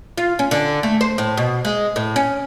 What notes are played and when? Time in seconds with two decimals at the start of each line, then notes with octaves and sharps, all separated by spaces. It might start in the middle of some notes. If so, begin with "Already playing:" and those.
0.18 F4
0.39 C#4
0.51 D3
0.83 A3
1.01 C5
1.18 A2
1.37 B2
1.65 G#3
1.96 A2
2.16 C#4